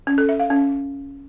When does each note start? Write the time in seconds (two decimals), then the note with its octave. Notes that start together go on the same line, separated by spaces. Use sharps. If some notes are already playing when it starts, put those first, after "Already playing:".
0.07 C#4
0.18 A4
0.29 E5
0.40 F5
0.50 C#4